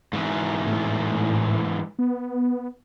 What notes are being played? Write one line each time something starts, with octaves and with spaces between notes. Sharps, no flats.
G#2 E3
A2
B3